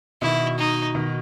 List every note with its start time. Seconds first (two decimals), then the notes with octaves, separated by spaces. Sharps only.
0.22 B2 D#3 E4
0.58 D#4
0.95 B2 D#3